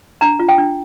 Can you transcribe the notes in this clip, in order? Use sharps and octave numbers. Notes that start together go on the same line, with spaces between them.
D4 A#5
F4
G5
D4